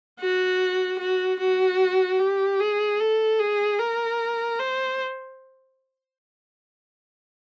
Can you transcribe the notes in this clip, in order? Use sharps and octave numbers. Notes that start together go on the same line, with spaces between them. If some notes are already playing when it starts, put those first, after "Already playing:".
F#4
F#4
F#4
G4
G#4
A4
G#4
A#4
C5